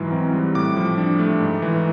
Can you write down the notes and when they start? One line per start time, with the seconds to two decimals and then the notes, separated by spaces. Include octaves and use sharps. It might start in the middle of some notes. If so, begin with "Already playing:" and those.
Already playing: G#2 E3 F#3
0.12 C4
0.34 G3
0.55 A2 D6
0.77 F3
0.98 D4
1.19 A3
1.40 G#2
1.62 E3